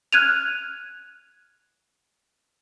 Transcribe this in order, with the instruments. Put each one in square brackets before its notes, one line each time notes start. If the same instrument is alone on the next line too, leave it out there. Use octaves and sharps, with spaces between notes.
[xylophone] F6 F#6 G#6 D#7 F7